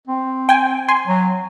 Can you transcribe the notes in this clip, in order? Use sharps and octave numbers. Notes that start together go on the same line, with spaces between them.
C4
G5 G#5
G#5 C6
F#3